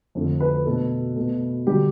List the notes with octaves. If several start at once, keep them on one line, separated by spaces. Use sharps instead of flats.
F2 D3 A3
B4
B2 A3 A4
B2 A3
D3 G3 G4